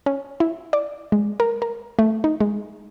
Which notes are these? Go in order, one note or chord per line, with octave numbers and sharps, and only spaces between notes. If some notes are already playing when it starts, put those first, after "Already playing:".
C#4
E4
D5
G#3
A#4
A#4
A3
D#4
G#3